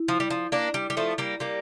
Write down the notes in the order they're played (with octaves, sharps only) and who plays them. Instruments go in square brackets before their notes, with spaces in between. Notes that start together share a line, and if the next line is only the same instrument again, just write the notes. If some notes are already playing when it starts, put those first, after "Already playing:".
Already playing: [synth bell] E4
[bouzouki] F3
G3
F3
A#3 D4
G3
G3
F3 A3
G3 A#3
G3 A#3